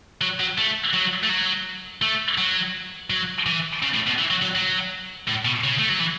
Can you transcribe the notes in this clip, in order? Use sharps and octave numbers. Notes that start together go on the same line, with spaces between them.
F#3
F#3
A3
F#3
A3
F#3
A3
F#3
F#3
E3
C#3
A2
B2
E3
F#3
F#3
F#3
A2
B2
C#3
A3
F#3
E3